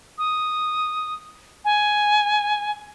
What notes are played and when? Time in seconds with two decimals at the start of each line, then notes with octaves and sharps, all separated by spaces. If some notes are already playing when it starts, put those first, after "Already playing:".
0.18 D#6
1.65 G#5